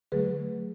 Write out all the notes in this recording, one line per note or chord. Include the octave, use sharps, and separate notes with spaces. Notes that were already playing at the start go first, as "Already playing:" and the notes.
D3 F#3 A3 G#4 B4